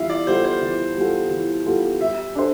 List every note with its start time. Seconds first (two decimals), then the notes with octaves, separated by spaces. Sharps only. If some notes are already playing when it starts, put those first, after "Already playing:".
Already playing: E3 G3 B3 F4 E5 F5
0.10 D5
0.27 G3 B3 F4 A4 C5
0.44 C5
0.62 E3
0.96 G3 B3 F4 A4
1.30 E3
1.66 G3 B3 F4 A4
2.01 G3 E5
2.35 D4 A4 C5